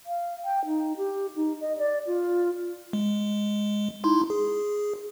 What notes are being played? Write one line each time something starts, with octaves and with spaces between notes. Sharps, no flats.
F5
G5
D#4
G4
D#4
D#5
D5
F4
G#3
D#4 E4 C6
G#4